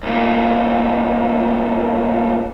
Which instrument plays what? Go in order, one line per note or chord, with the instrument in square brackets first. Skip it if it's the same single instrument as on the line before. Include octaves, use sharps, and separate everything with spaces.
[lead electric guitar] C2 A#2